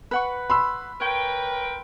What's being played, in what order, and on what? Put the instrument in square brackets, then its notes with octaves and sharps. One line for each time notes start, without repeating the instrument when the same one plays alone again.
[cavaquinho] B4 F#5 C#6
[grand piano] B5 C6 E6
[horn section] A#4 B4 G5 [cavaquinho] C#5